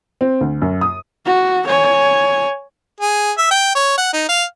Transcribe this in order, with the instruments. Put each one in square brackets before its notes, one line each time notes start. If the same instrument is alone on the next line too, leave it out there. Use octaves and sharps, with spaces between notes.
[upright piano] C4
D2
F#2
D#6
[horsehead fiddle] F#4
C#5 G#5
[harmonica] G#4
E5
G5
C#5
F#5
D#4
F5